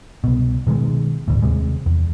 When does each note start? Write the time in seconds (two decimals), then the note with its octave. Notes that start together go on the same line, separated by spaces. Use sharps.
0.24 C2 B2
0.67 B2 D#3 F3 G#3
1.28 G#1 D2 A2
1.42 D#2 C3 G#3
1.86 E2